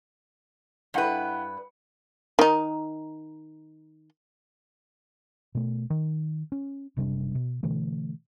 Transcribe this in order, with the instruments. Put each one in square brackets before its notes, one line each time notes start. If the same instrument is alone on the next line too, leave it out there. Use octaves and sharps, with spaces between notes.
[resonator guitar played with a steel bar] G2 B4 [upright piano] E4 F#5 G5
[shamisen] D#3 D#4
[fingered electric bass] B2 A3
D#3
C#4
F#1 C3 G3 D4
B2
B2 D3 E3 A3